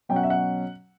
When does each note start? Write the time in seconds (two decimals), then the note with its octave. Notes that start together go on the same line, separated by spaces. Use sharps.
0.09 B2 F#3 C#4 G5
0.16 F#5
0.23 E5
0.30 F#5